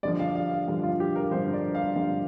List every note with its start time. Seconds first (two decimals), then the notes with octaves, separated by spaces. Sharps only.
0.03 G2 D3 F3 D5
0.19 F5
0.35 F5
0.51 F5
0.68 G2 D3 F3
0.83 F4
1.00 G4
1.16 A#4
1.31 G2 D3 F3 C5
1.53 D5
1.75 F5
1.96 G2 D3 F3 F5